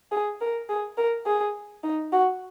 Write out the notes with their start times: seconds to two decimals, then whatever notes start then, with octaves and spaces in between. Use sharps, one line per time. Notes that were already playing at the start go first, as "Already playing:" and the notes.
0.12 G#4
0.41 A#4
0.69 G#4
0.97 A#4
1.26 G#4
1.83 D#4
2.13 F#4